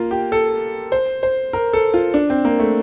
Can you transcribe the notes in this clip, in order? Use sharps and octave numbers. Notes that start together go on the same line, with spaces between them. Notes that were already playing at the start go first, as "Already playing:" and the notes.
Already playing: A#3 F4
G4
A4
C5
C5
A#4
A4
F4
D4
C4
A#3
A3